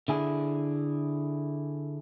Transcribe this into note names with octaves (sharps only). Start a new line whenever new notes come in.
D3 E4 G#4